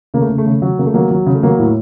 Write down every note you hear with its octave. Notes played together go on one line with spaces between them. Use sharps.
C#3 A#3
A3
C#3
A3
C#3
F#3
C#3 A#3
A3
F#3 A#3
F#3
C#3
A3
F#3 A#3
A2